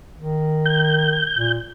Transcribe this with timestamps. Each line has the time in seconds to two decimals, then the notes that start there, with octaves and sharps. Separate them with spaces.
0.18 D#3
0.65 G6
1.36 A#2